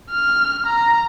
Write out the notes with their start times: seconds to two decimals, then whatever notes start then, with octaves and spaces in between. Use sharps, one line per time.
0.10 F6
0.66 A#5